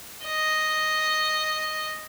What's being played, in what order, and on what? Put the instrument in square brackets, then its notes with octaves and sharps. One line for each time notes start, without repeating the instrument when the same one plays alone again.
[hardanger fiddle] D#5